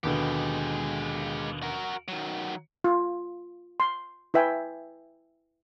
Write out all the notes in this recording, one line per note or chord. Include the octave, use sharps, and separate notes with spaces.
D#2 B2 D3 G#3 G4
F#4 A#4
D#3 F#3
F4
C6
E4 B4 E5 G5 G#5